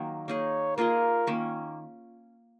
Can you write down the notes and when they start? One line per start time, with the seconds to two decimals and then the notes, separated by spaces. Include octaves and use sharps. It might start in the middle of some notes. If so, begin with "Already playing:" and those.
Already playing: D#3 F#3 A#3
0.28 A#3 D#4 G#4 C#5
0.77 A#3 F4 G#4 A#4 D#5
1.27 D#3 A#3 C#4